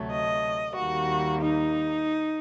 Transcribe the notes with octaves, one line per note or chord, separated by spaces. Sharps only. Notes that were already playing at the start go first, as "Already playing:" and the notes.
Already playing: D2 C3 F#3 A3
D#5
D#2 D#3 G3 A#3 F#4
D#4